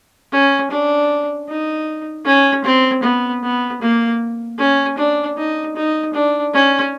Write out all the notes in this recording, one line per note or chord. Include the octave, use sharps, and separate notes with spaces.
C#4
D4
D#4
C#4
C4
B3
B3
A#3
C#4
D4
D#4
D#4
D4
C#4